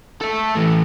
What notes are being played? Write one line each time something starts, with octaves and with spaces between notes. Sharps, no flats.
A4 E5
E3 A3